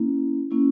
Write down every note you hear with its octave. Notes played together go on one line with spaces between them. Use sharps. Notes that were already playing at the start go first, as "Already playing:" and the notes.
Already playing: A#3 C#4 E4
A#3 C#4 E4